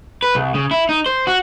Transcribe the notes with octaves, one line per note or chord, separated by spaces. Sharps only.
B4
C2
C#3
E4
D#4
C5
F#4